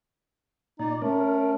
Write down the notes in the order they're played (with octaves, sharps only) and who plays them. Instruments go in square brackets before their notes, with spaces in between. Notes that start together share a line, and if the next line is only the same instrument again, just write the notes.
[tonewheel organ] A#2 D5 [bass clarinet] D#4
[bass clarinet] A3 [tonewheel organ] C#4 A#4